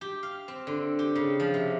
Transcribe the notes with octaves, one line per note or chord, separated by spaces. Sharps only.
G4
F5
C4
D3
G4
C#3
F3
C3